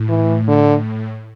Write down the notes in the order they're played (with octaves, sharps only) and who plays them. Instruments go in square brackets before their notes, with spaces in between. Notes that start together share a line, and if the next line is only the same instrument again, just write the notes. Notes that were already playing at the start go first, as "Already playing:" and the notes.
Already playing: [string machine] A2
[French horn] E3
D3